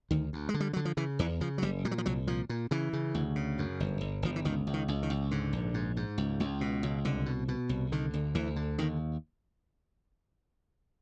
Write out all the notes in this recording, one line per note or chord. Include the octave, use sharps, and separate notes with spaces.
D2 D#3
D2
G#3
D3
G3
D3 F#3
F3
C#3 E3
E2 E3
C#3 F3
F#3
F#1 G3
A#2 G3
F#3
F3
C2 F#3
A#2 F3
A#2
C#3 E3
C#3
D2
C#3
F#2
G1
G1
G1 F3
E3
C#2 D#3
C#2
D#3
C#2
D#3
C#2
G#2 D3
A#1
G#2
G#2
C#2
C#2
B2
C#2
C2 D3
B2
B2
C2
D3 D#3
D2
D2 E3
D3
D#2 D#3